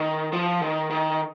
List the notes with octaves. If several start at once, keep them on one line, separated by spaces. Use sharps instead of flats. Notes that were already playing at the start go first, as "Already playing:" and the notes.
Already playing: D#3
F3
D#3
D#3